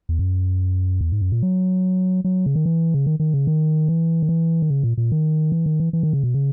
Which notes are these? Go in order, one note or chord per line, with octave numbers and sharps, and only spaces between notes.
E2
F#2
E2
G#2
F#2
A#2
F#3
F#3
C#3
D#3
E3
C#3
D#3
D#3
C#3
D#3
E3
D#3
E3
D#3
C#3
A#2
A#2
D#3
E3
D#3
E3
E3
D#3
C#3
B2
C#3